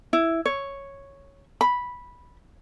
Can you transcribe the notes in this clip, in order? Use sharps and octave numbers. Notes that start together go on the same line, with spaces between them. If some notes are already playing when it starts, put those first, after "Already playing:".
E4
C#5
B5